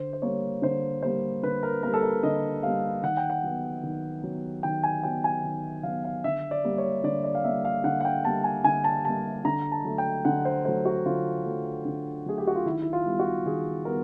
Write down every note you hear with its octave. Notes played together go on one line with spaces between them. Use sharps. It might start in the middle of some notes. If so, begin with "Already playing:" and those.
Already playing: D3 C5
C5
G3 A#3 C#5
D3 C5
G3 A#3 C5
D3 B4
A#4
G3 A#3 A#4
A4
A#4
D3 D#5
G3 A#3 F5
D#3 F#5
G5
F#5
F#3 B3
D#3
F#3 B3
D#3 G5
G#5
F#3 B3 G5
G#5
D#3
F#3 B3 F5
F5
D3 E5
D5
G3 A#3
C#5
D3 D5
D5
F5
G3 A#3 E5
F5
D3 F#5
F#5
G5
G3 A#3 A5
G#5
D3 G#5
A5
G3 A#3 A5
D3 A#5
A5
F#3 A3
G5
D3 F#5
C5
F#3 A3 C5
F#4
D3 F4
F#3 A3
D3
F#3 A3 G#4
G4
F#4
F4
D#3 E4
E4
F4
G3 B3
F#4
D#3 G#4
G3 B3 A#4